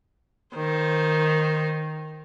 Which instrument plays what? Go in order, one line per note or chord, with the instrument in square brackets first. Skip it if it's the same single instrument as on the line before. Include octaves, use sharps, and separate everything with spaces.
[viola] D#3 C5